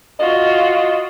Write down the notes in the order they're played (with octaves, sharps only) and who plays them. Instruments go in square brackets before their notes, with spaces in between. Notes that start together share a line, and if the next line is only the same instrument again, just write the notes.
[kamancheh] F4 F#4 [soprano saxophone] D#5